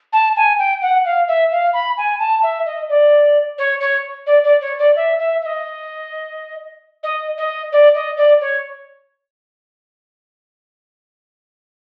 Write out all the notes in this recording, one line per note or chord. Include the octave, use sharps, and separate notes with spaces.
A5
G#5
G5
F#5
F5
E5
F5
B5
G#5
A5
E5
D#5
D5
C#5
C#5
D5
D5
C#5
D5
E5
E5
E5
D#5
D#5
D#5
D5
D#5
D5
C#5